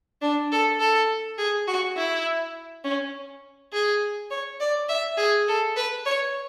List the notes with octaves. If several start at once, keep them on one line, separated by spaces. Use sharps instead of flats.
D4
A4
A4
G#4
F#4
E4
C#4
G#4
C#5
D5
E5
G#4
A4
B4
C#5